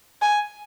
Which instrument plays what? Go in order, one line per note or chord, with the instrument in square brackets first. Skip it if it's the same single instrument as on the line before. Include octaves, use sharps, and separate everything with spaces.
[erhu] G#5